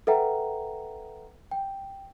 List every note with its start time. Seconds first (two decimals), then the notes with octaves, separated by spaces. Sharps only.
0.07 A4 B4 E5 F#5 G5 A#5
1.51 G5